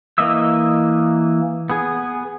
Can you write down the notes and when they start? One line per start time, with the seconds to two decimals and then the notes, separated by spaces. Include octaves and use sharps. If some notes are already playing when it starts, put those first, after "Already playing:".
0.18 E3 A#3 D#5 E5 E6
1.70 B3 G#4